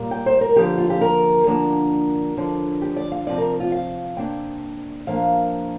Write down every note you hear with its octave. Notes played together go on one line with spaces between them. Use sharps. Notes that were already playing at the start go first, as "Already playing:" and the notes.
Already playing: A#2 G3 A#3
G5
C5
A#4
D3 F3 A#3 G4
F4
G4
A#4
D3 F3 A#3 D4
D3 F3 D4
G4
D5
F5
C3 F3 C4 D5
A#4
F4
F5
C3 A#3 D4 G5
A#2 F3 A#3 D4 F5